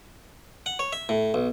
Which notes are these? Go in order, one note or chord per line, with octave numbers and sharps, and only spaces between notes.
F#5
C#5
E5
A2
B1